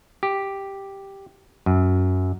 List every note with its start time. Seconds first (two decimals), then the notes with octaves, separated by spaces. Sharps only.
0.23 G4
1.66 F#2